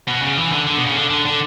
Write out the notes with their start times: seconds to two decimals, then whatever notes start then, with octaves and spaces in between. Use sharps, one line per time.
0.08 B2
0.22 C#3
0.38 E3
0.52 D3
0.67 D3
0.77 B2
0.86 C#3
0.96 D3
1.10 D3
1.26 D3